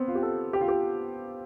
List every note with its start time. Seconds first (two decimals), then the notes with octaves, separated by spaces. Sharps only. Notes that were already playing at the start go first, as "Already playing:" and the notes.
Already playing: B3 C4
0.08 F4
0.15 G4
0.23 A4
0.53 G4
0.61 F4
0.68 G4